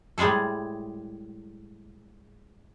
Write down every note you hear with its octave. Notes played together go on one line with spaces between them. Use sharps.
A2 G3 G#3 G#4 A4